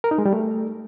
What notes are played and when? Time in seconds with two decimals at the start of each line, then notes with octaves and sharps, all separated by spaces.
0.04 A#4
0.11 D#4
0.18 G#3
0.25 G3
0.33 A3